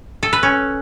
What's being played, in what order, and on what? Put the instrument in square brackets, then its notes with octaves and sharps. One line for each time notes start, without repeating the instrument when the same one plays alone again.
[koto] A4
B4
C#4